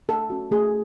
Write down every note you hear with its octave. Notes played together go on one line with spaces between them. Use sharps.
A3 A4
C#4 F#4
A3 G#4